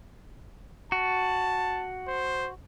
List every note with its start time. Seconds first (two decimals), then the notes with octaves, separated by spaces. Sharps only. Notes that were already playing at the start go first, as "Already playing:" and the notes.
0.92 F#4 A5
2.07 C5